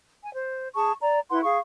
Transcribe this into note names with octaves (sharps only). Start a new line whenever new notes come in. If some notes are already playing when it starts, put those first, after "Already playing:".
G#5
C5
G#4 A5 C#6
D5 A#5
E4 B4 F#5 C6
G#4 F5 C#6